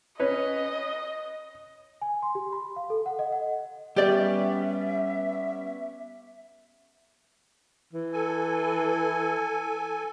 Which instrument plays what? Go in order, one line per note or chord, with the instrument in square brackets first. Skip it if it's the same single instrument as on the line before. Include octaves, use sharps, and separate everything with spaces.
[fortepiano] C#4 B4 C#5 [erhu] D#5
[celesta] G#5
C6
G4
B5
F5
A4
F#5
D#5
F#5
[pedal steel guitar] G3 B3 C#4 [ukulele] G4 D5 [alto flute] E5
[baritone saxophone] E3
[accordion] A4 G#5